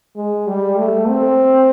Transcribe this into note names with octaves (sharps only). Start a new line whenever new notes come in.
G#3
G3
A3
C4